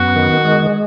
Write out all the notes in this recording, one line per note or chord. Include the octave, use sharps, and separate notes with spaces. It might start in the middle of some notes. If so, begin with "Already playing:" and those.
Already playing: F#2 B3 F#4
D#3
G#3